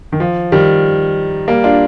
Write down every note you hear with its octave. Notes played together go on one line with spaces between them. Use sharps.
D#3
F3
D#3 G3
G3 A#3
D4 F4